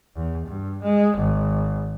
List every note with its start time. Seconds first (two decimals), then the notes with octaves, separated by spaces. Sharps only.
0.16 E2
0.46 G2
0.83 G#3
1.17 G#1